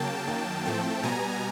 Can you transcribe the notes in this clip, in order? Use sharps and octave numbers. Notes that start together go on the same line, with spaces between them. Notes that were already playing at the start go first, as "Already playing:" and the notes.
Already playing: C#3 F#3 A#3 G5 A5
F#2 D#3 F#3 A#3
A2 F3 A3 C4 G5 A5
B2 G3 B3 G#5 A#5